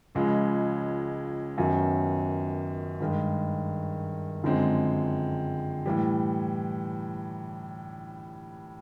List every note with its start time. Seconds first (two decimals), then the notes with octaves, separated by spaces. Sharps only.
0.15 C#2 C#3 F3 G#3
1.58 F#2 D#3 F#3 B3
3.00 G2 D#3 G#3
4.43 F#2 D3 F3 G#3 C4
5.86 A2 E3 G3